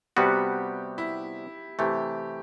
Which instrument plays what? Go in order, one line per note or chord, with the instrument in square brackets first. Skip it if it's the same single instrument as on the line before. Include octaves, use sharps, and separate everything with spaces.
[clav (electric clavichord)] C3 G3 B3 F#4 [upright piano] G4
[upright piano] E4
[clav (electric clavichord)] C3 E3 A3 [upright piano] G4